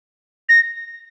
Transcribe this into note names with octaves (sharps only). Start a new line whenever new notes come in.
A#6